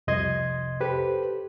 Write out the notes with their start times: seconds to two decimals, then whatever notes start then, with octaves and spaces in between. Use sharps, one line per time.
0.07 C2 F2 C3 D#5 C6 G#6
0.81 G4 A4 B4 C5